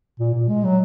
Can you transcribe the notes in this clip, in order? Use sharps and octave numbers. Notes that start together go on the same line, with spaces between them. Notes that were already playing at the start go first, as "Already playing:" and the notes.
A#2
A#2
G#3
F#3